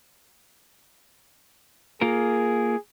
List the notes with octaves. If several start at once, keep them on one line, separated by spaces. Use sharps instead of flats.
A#3 F4 G#4 A#4